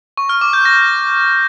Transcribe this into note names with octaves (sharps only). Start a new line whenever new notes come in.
C#6
F6
D6
G6
A#6